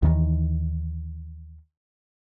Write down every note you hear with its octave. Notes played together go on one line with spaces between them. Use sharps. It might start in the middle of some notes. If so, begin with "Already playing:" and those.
D#2 D#3 E3